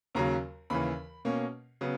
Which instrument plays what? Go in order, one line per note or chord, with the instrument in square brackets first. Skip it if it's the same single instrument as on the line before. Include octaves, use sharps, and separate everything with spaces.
[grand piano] D#2 C#3 F#3 A#5
D#2 C#3 E3 B5
B2 A#3 C#4
C#3 F#3 B3